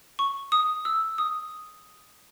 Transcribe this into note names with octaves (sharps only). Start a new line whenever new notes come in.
C#6
D#6
E6
D#6